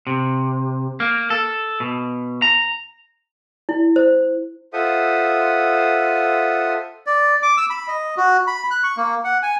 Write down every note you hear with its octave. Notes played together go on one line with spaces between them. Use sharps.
C3
A#3
A4
B2
A#5
E4
C5
F4 A4 C5 E5 F#5 D#6
D5
D6
E6
B5
D#5
F#4
B5
F#6
C#6
A#3
F#5
G#5